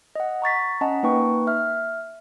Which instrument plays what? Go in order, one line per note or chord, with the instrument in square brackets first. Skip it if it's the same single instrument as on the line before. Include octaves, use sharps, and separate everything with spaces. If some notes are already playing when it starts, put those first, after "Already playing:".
[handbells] D#5 F#5
A#5 C#6 A6 B6
C#4 D#5 F#5 A5 A#5
A#3 D#4 B4 G5 C#6
E5 F6